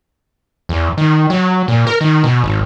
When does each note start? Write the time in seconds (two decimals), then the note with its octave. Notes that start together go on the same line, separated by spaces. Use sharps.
0.69 E2
0.97 D#3
1.30 F#3
1.68 A#2
1.87 A#4
2.01 D#3
2.24 B2
2.44 G#1